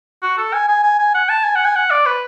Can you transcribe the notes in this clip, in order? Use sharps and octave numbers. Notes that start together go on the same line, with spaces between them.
F#4
A4
G#5
G#5
G#5
G#5
F#5
A5
G#5
F#5
G#5
F#5
D5
B4